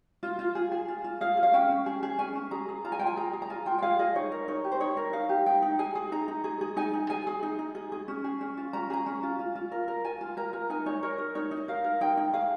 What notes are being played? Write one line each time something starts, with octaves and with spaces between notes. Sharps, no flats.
F4
F4
G#4
G#4
F4
F4
G#4 F5
G#4
F5
C#4 G5
C#4
G#4
G#4
C#4 G#5
C#4
G#4 A#5
G#4
F4 A#5
G#5
F4 G5
G#5
G#4 A#5
G#4
A#5
F4 G#5
F4 G5
G5
G#4 F5
G#4 D#5
D#4 C#5
A#4
D#4 C#5
G4
C5
D#4 C#5
A#4
D#4 F5
G4
D#4 G5
D#4
G#4 G#5
G#4
D#4 A#5
D#4
G#4
G#4
D#4 G#5
D#4
G#4 G#5
G#4
D#4
D#4
G#4
G#4
C#4
G#4
C#4
F4
C#4 A#5
G#4 A#5
C#4
F4
F4
F4
A#4
A#4
F4 G#5
F4
A#4 A#5
A#4
D#4 G#5
D#4 C#5
A#4 C#5
A#4
D#4 C#5
D#4
A#4 F5
A#4
D#4 G5
D#4
G#4 F5